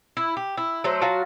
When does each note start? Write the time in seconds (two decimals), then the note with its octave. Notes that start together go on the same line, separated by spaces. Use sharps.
0.17 E4
0.37 G4
0.57 E4
0.84 F#3 A3 C5
1.01 F#3 F4 F#4 A5